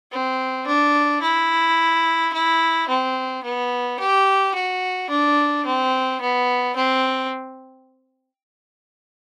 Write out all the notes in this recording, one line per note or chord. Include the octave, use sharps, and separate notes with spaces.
C4
D4
E4
E4
C4
B3
G4
F#4
D4
C4
B3
C4